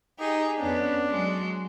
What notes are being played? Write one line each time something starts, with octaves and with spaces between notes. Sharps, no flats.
D#4 G4 G#4
F2 B3 C#4 D4
F#3 G#3 F#4